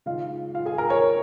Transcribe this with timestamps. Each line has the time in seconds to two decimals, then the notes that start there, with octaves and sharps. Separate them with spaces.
0.06 C#3 G#3 D#4 F4 F5
0.54 F4 F5
0.66 G#4 G#5
0.78 A#4 A#5
0.90 C#5 C#6